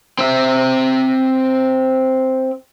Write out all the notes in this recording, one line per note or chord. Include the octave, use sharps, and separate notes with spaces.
C4 E5